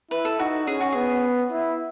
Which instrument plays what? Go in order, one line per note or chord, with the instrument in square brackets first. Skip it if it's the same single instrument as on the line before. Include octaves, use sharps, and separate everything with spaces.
[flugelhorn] E4 [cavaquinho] B4
[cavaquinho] A4
[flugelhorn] D#4 [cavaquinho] F#4
[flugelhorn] C#4 [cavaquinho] G#4
[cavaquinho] F#4
[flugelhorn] B3 [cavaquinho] G#4
[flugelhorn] E4